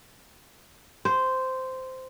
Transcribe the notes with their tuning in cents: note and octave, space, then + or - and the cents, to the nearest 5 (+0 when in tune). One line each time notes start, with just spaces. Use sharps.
C5 -10